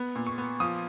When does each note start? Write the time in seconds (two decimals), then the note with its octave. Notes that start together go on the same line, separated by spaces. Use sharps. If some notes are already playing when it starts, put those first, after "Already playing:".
Already playing: B3
0.15 A#2
0.27 C#6
0.38 B3
0.60 F3 D#6